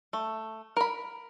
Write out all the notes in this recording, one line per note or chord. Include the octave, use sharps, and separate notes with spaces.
A3
A#4 B5